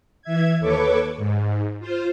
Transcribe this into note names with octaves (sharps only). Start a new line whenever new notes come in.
E3 E5 G#6
D#2 A4 B4 C#5 C#6 D6
G#2
F4 C5